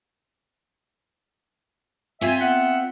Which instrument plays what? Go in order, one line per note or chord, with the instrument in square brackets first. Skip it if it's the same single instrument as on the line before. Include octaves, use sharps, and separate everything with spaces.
[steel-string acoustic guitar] C4 F4 [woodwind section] E5 G#5
[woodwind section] B3 E5 F#5